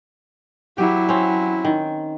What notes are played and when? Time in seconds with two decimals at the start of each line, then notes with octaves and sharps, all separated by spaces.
0.78 F#3 E4 G4
1.09 C4 C#4
1.65 D#3